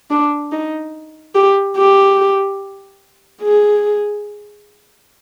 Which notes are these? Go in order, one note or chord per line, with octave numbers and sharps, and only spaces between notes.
D4
D#4
G4
G4
G#4